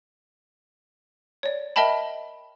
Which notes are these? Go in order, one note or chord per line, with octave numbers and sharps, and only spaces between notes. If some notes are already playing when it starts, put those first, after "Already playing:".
C#5 D5
A#4 D#5 E5 G5 A5 B5